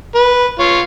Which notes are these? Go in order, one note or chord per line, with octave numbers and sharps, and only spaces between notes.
B4
F4 C#5